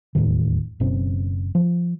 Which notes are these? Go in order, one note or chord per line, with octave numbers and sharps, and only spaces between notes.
E1 D#2 A2 D#3
F#1 B2 C4 C#4
F3